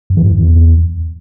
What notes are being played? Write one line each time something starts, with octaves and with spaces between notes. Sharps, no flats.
F#2
E3
G#2
F2
E2